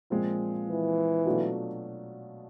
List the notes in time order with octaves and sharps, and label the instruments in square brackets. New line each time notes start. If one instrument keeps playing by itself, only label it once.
[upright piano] A#2 F3 G#3 C4 F4
[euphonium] E3
[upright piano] B2 F#3 A3 D4 F4